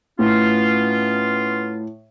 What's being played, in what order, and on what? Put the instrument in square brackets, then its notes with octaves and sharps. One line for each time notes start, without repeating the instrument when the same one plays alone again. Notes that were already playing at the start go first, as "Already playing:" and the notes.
[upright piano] A2 [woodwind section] B3 C#4 F4